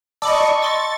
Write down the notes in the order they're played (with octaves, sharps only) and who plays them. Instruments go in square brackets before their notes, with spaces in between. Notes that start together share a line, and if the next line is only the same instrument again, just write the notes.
[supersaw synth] D5 D#5 [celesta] A5 [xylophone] B5 D6 E6 [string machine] C#6
[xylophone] D#5 C6 E6 [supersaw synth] A6